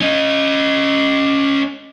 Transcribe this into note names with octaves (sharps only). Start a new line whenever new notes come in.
C#4 D#5